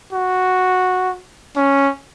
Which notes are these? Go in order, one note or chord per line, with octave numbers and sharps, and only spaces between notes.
F#4
C#4